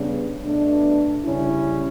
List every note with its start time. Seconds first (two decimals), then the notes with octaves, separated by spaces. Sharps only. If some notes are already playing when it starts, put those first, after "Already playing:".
Already playing: C#3 G3 B3 D4
0.43 B2 A3 D4
1.24 C#3 G3 C#4 E4